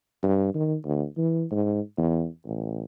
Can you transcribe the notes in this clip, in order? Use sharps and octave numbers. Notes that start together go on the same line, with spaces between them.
G2
D#3
D2
E3
G#2
E2
A1